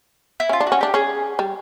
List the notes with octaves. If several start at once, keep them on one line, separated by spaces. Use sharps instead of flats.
E4
C#4 F4
D4
C#4 F#4
D4 G4
C#4 G#4
G3